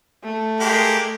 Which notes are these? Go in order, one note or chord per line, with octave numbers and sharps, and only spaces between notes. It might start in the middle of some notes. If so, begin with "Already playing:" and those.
A3
G#3 A#3 G4